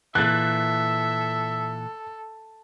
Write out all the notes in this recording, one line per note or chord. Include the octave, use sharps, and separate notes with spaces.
A#2 E3 A4 E5 F#6 A6